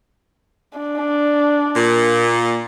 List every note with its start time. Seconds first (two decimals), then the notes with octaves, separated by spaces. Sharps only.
0.78 D4
1.76 A#2